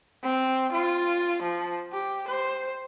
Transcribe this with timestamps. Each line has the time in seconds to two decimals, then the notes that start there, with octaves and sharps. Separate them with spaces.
0.24 C4
0.72 F4
1.43 F3
1.93 G4
2.28 C5